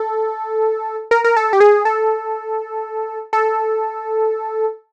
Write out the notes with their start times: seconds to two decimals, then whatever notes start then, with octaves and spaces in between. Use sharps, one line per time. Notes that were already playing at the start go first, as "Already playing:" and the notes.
Already playing: A4
1.11 A#4
1.24 A#4
1.36 A4
1.53 G4
1.60 G#4
1.85 A4
3.33 A4